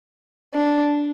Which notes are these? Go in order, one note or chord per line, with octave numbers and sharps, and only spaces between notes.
D4